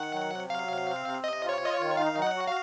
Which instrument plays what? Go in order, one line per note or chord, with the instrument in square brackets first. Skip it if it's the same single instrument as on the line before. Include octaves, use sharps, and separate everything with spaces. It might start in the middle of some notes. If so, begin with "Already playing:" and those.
Already playing: [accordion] D#3 [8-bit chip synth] F#5
[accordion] F#3
C3
[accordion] F#3 [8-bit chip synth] F5
[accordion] C3
C4
C3
[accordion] C3 [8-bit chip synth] D#5
[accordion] F4
[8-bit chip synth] C#5
[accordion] F4
[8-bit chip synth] D#5
C#5
[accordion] D#3
[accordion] D#4 [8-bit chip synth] F5
[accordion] F#3
[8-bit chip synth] F#5
[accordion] F#4
[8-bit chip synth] F5